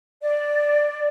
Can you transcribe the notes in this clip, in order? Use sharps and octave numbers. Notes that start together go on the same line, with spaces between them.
D5